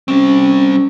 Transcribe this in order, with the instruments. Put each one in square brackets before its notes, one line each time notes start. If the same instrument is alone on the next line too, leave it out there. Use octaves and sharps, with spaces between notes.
[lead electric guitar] G3 C4 [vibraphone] C#4